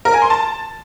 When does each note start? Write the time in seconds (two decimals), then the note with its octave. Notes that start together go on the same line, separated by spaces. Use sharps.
0.05 A#4
0.14 G#5
0.22 C6
0.30 A5